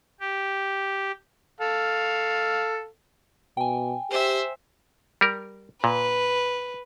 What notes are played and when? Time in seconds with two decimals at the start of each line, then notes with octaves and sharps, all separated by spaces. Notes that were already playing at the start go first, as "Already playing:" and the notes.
0.20 G4
1.61 A4 F5
3.57 B2 G5 G#5
4.10 G4 C5 E5
5.21 G3 A#4
5.84 A#2 B4